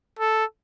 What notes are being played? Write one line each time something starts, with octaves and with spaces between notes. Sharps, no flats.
A4